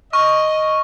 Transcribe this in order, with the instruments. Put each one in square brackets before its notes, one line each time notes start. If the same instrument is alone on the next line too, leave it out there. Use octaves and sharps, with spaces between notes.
[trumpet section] D#5 [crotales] C#6 F6